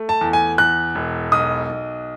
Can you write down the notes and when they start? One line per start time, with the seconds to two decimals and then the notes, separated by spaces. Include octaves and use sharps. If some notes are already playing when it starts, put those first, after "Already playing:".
Already playing: A3
0.09 A5
0.21 E2
0.33 G#5
0.58 E2 F#6
0.95 E1
1.32 B1 D#6
1.69 B1